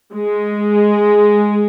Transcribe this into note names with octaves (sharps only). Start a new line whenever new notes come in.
G#3